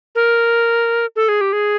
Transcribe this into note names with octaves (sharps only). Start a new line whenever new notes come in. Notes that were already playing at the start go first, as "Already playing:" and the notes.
A#4
A4
G#4
G4
G#4